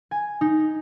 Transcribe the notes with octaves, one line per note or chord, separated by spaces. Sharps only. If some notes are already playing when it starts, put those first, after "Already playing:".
G#5
D#4